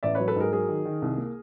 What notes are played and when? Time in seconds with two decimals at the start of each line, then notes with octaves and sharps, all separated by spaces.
0.03 A1 D5 E5
0.15 F#3 B4 C#5
0.28 A4 B4
0.36 G#2 G#4 A#4
0.53 F#3 G#4 A#4
0.69 D#3
0.85 D#3
1.02 C2
1.18 A#3